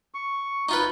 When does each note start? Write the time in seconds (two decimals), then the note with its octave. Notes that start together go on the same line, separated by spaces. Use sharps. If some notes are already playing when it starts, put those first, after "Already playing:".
0.14 C#6
0.69 D#4 F4 B4